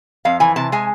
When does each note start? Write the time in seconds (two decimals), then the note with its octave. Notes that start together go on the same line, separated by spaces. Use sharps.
0.25 F2 F5
0.40 E3 G#5
0.56 C3 A5
0.72 G#3 G#5